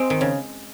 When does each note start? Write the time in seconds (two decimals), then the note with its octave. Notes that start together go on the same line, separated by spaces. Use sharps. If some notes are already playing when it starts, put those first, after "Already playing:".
Already playing: G#3 C4
0.10 D#3
0.21 C#3